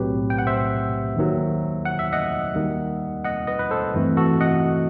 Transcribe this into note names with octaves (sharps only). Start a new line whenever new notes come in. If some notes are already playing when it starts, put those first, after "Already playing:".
Already playing: B1 A2 F#3 A3 C4 G4 B4
G5
F#5
C5 E5
D#2 D#3 F#3
F#5
E5
D#5 F#5
D#2 D#3 G3
D#5 F#5
B4 D#5
B4
A4 C5
G2 E3 A3 C4
F#4 A4
D#5 F#5